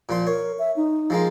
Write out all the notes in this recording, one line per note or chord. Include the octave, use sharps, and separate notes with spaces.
A#2 F3 C6
A#4 C#5
E5
D#4
F3 G#3 A#3